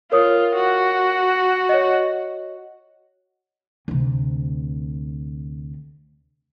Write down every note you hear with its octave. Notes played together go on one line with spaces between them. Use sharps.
F4 A#4 C#5 D#6
F#4
C#5 D#5
D2 C3